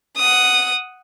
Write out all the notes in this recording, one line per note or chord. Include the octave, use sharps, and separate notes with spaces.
F#5 D#6